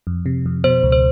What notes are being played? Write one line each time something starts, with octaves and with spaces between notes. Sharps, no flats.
F2
C3
F2
B2 C5
C#2
C5